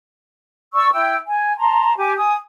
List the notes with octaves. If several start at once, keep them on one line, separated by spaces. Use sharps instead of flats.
D5 C#6 E6
E4 G5 E6
G#5
A5 A#5 C6
G4 G#5 D6
G#5 D#6